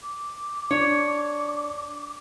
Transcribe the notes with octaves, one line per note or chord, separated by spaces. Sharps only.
D6
D4 C#5